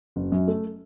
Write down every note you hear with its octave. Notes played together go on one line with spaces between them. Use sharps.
F#1
F#2
A3